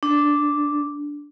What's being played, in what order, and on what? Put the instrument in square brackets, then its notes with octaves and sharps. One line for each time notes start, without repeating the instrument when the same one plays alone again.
[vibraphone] D4